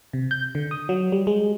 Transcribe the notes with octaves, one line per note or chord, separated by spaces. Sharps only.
C3
G6
D3
D#6
F#3
G3
G#3